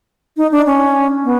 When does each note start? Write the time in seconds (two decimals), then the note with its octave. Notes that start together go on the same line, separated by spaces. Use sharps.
0.37 D#4
0.51 D4
0.66 C#4
1.24 B3